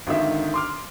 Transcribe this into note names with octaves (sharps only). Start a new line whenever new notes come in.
G#1 D3 D#3 E5
C6 D6 F6